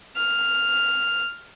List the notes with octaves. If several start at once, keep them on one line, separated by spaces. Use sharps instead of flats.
F6